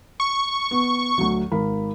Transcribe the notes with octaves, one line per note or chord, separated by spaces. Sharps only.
C#6
B3
D2 F#3
G#1 A#4 B5